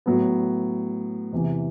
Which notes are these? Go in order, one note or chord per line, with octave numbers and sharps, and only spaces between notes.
A2 F#3 B3
E2 C3 E3